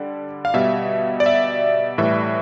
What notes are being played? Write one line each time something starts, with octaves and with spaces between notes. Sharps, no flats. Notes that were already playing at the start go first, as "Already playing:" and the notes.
Already playing: D3 G3 D5
F5
B2 G3 E5
D5
E5
A2 E3 G3 E5